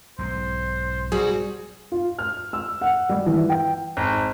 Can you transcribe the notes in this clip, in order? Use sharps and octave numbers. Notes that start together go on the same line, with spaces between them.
B1 G#2 C5
G3 C4 F#4 G#4
F4
F6
E6
F#5
G3
E3
G5
G#1